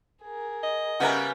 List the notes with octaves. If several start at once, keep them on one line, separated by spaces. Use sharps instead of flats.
G#4 A#4
D#5
C#3 G3 B3 A#4 E5 F#5 G#5 F#6